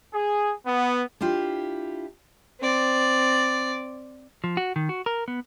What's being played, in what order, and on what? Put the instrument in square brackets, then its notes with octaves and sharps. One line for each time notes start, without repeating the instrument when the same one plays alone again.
[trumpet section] G#4
B3
[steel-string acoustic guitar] D4 E4 F4 G4
[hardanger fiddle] C4 D5
[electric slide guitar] F3
F#4
D#3
F#4
A#4
B3